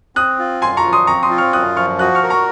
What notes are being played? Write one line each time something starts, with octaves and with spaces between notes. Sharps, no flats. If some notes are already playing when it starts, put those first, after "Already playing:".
C4 D#6 F#6
F4
F#2 G#5 C6
A#5 C#6
F3
C6 D#6
C4 A#5 C#6
C6 D#6
F4
C#6 F6
F#2 D#6 F#6
F3 C#6 F6
F#4 D#6 F#6
C#6 F6
A#4
A#5 C#6